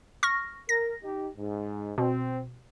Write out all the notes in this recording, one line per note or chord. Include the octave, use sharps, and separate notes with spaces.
C#6 F6 A#6
A#4 A#6
D#4 G4
G#2
B2 C4